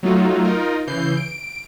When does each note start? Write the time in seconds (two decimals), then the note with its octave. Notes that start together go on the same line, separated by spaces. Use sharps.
0.03 F#3 A3 D#4 F4 F#4
0.45 D#4 F4 A#4
0.87 C#3 E3 G6 C7
1.17 D7